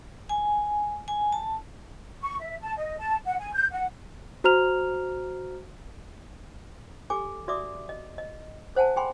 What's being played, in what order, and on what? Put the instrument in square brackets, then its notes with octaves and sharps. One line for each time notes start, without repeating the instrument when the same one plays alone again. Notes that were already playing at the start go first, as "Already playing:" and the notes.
[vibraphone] G#5
G#5
A5
[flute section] C#6
E5
A5
D#5
A5
F#5
G#5
G6
F#5
[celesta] F#4 C5 A#5 F6 F7
[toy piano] G4 A4 G#5 D6
F#4 D5 E5 C6 D6 D#6
D#5
D#5
A4 C5 F#5 G#5 A5
G#4 G5 G#5 B5 C6